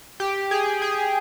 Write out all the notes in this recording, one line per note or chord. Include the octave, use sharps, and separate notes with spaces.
G4
G#4
G#4